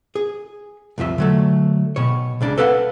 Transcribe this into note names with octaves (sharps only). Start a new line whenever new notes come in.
G#4
C2 F2 F4 E5
D3 F#3 A3
B2 C#5
C#2 C#3 D4
A4 B4 D5 F5 F#5